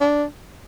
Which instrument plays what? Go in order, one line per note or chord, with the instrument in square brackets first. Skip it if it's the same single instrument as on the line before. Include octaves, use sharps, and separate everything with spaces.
[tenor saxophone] D4